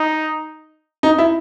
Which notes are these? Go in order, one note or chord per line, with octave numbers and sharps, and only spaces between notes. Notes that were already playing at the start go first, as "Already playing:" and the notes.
Already playing: D#4
D#4
E4